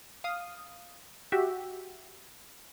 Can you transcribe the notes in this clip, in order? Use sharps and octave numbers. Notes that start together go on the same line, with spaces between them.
F5 D#6
F#4 G4 E5